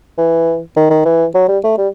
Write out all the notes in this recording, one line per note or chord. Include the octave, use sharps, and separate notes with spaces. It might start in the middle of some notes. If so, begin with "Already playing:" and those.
E3
D#3
D#3
E3
F#3
G3
A3
G3